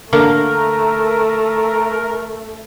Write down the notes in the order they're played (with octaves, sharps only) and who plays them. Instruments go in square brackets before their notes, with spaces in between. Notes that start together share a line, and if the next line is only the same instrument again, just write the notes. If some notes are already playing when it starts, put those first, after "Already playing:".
[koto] D3 A#3 [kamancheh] A3 [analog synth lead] A#4